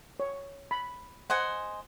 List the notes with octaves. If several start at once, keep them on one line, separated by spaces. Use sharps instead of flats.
C#5
B5
C5 D#5 F#5 G#5